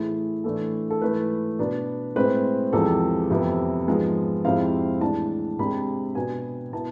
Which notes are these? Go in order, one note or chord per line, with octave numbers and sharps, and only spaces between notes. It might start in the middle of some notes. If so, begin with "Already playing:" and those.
Already playing: A2 E3 A3 E4 G#4
A2 E3 A3 D4 A4
A4
G#2 E3 A3 B4
B2 B3 D4
A2 G#3 C4 E4 B4
E2 C3 F3 G#3 A4
F2 C3 E3 B3 E4
G#2 F3 G#3 B3
F2 C3 G#3 C4 E4 F5
A2 E3 G#3 D4 A5
C3 G#3 D4 B5
B2 B3 D4 G#5
B2 B3 E4 A5